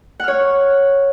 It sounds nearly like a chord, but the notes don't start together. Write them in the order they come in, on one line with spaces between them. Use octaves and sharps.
F#5 F6 C#5